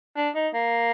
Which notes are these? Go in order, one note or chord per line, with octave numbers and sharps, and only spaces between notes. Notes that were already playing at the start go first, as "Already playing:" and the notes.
D4
D#4
A#3